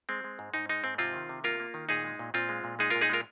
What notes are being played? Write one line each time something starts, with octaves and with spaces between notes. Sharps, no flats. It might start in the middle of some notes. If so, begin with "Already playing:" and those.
G#3 C4
G#3
G#2
G#2 D#4
G#3 D#4
G#2 C4
C3 C4 F4
D#3
C3
A#3 F4 A#4
A#3
D#3
A#2 D#4 G#4
G#3
A#2
A#2 C4 F4
G#3
A#2
G#3 D#4 G#4
A#2 F4 A#4
D#4 G#4
G#3 F4 A#4